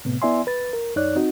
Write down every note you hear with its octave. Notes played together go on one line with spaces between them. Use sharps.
A2 C3 B3
B3 E4 D5 E5 G#5 C6
B4 A6
A#4
F#2 D#4 C#5 D5 F#6
C4 D#4 F#4